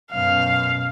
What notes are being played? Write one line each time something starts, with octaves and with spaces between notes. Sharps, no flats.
F#2 B2 F5